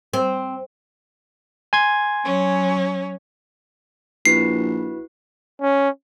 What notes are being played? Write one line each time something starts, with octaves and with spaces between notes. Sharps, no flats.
C4
G#5 C6 G#6
F#3 C#4
A#1 E4 F#4 B4 C7
C#4